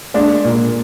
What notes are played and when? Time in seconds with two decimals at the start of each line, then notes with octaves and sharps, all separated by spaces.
0.14 G#3 D4
0.45 A#2